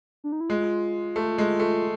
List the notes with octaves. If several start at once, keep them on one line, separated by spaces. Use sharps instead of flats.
D4
D#4
E4
G#3 F4
A3
G#3
A3